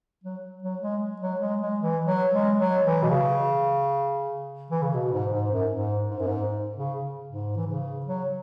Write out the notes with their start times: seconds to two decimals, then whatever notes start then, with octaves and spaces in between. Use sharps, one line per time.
0.24 F#3
0.63 F#3
0.82 G#3
1.21 F#3
1.41 G#3
1.61 G#3
1.80 E3
2.06 F#3
2.32 G#3
2.59 F#3
2.85 E3
3.03 B2
3.10 C#3
4.71 E3
4.82 C#3
4.94 B2
5.12 G#2
5.33 G#2
5.51 F#2
5.71 G#2
6.10 G#2
6.19 F#2
6.27 G#2
6.76 C#3
7.28 G#2
7.57 E3
7.67 C#3
8.06 F#3